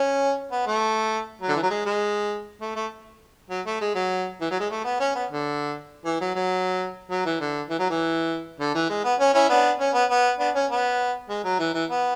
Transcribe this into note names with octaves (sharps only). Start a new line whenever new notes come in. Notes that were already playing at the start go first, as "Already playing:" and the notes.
Already playing: C#4
B3
A3
F#3
D3
E3
F#3
G#3
G#3
A3
A3
F#3
A3
G#3
F#3
E3
F#3
G#3
A3
B3
C#4
B3
D3
E3
F#3
F#3
F#3
E3
D3
E3
F#3
E3
D3
E3
G#3
B3
C#4
C#4 E4
B3 D4
C#4
B3
B3
B3 D4
C#4
B3
G#3
F#3
E3
E3
B3